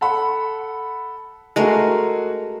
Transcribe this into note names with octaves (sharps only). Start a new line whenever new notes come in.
A4 F#5 B5
G#3 A3 F#4 G#4 A#4